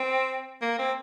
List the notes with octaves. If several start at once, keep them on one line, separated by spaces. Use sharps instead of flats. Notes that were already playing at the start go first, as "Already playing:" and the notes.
Already playing: C4
A#3
C4